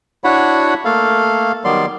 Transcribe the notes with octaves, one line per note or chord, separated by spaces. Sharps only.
D4 E4 F#4 C#5 F#5 B5
A3 A#3 A4 F5
D#3 F#3 G3 B3 D5 C6